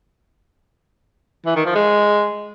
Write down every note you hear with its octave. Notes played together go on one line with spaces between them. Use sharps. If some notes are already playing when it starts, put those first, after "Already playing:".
E3
D#3
F3
G#3